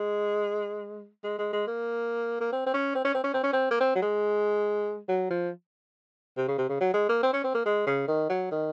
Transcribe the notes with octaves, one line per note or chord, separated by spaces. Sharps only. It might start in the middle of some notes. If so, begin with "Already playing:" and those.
Already playing: G#3
G#3
G#3
G#3
A#3
A#3
C4
C4
C#4
C4
C#4
C4
C#4
C4
C#4
C4
A#3
C4
F#3
G#3
F#3
F3
C3
C#3
C3
C#3
F#3
G#3
A#3
C4
C#4
C4
A#3
G#3
C#3
D#3
F#3
D#3